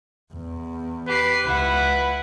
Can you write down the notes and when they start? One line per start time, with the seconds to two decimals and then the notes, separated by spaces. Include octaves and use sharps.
0.33 E2
1.08 G4 B4 C7
1.46 C#2 E4 B4 F#5